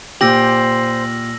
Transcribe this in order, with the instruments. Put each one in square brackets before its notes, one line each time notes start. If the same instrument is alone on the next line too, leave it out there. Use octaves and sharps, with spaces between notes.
[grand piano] A#2 [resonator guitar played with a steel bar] G4 [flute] C5 [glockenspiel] E6 A#6 F#7